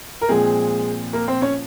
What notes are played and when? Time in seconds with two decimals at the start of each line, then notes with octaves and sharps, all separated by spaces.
0.22 A#4
0.28 A#2 F3 G#3 C4 G#4
1.13 A#3 A#4
1.28 C4 C5
1.42 C#4 C#5